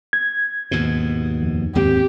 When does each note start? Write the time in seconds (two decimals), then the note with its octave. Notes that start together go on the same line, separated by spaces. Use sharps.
0.13 G#6
0.71 D#2 G#2 B2
1.42 F2
1.75 D#2 G#2 C4 G4